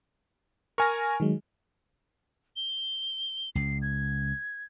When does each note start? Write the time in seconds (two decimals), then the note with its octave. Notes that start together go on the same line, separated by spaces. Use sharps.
0.78 A#4 G#5 C#6 F6 A#6
1.20 D#3 F#3 G#3
2.56 G7
3.55 C#2 C7
3.82 G#6